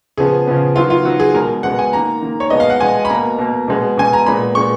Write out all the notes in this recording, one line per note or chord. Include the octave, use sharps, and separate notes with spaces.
C#3 F3 B3 G#4
C#3 F3 B3
D#3 F#3 B3 F4
F4
D#3 F#3 B3 F#4
G#4
B2 G#3 B3 A#4
B2 G#3 B3 F#5
G#5
D#3 A#3 A#5
D#3 A#3
C#5
B2 G#3 B3 D#5
F5
F#5
B2 G#3 B3 G#5
B5
B2 A#3 A#5
B2 A#3
B2 G#3 B3
B2 G#3 B3 G#5
A#5
A#2 G#3 B3 B5
A#2 G#3 B3 C#6